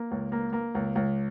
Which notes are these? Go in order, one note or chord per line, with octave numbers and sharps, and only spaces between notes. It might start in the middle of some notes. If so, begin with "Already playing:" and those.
Already playing: A#3
C#2
A#3
A#3
C#2
C#2